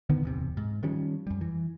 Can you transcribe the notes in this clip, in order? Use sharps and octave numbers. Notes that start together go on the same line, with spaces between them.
D3 D#3 B3
D1 E2 C3
G#2
D#3 F3 G3 C#4
F2 G3
E3